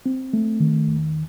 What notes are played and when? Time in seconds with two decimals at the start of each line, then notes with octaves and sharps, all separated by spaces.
0.06 C4
0.33 A3
0.60 D#3
0.87 E2